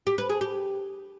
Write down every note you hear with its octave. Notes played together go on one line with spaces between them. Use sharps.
G4
B4
G#4
G4